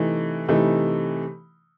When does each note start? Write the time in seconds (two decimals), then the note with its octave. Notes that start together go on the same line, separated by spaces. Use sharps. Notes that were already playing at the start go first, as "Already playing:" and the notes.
Already playing: C3 E3 A3 D#4
0.48 C3 E3 A3 D#4